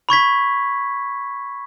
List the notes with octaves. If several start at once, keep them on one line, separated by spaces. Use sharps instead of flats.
B5 C#6 G#6 B6